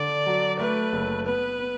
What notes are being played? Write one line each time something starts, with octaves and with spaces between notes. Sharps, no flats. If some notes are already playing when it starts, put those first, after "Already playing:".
Already playing: D3 D5
F#3
A3 B4
F#1
B3 B4
B3